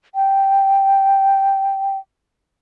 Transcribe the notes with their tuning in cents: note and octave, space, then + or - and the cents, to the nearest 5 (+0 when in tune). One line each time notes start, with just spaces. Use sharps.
G5 -5